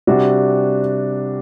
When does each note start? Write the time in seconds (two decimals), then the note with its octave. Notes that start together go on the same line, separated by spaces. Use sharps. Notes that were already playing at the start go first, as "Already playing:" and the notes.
0.07 C3 G3 D4 F#4